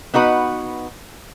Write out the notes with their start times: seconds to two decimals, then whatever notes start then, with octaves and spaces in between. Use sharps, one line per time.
0.14 B3 D#4 F#4 B4